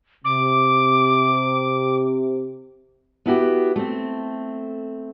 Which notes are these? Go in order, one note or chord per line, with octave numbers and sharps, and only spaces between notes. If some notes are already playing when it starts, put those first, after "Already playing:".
C3 D6
B3 E4 F#4 G4
A3 C4